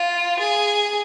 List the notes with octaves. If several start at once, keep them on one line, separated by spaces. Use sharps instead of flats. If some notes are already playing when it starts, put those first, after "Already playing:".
Already playing: F4
G#4